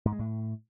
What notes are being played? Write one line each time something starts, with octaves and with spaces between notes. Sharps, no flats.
G#2
G#3
A2